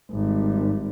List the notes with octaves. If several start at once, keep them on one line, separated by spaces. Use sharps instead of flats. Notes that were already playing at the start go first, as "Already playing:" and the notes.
G#1 G3